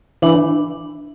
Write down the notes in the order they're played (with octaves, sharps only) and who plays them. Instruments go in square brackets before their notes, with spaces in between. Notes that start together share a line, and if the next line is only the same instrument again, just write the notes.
[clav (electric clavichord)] E3 [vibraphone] D4